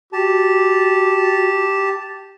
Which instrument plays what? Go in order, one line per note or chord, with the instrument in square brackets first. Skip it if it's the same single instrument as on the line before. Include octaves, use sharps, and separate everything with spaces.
[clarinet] F#4 [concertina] G4 A5